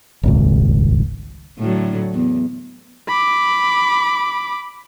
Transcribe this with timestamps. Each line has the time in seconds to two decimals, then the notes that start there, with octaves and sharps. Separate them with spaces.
0.23 D#1 G#1 C#2
1.59 A2 D3 F#3
2.14 E2
3.08 B5 D6